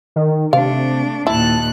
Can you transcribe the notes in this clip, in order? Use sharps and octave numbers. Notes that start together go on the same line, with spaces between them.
D#3
C3 A3 D4 F5
D#2 A#2 E4 A5 F#6